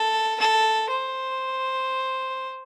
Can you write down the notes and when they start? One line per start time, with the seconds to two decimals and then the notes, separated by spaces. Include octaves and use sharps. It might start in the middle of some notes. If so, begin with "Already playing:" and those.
Already playing: A4
0.40 A4
0.90 C5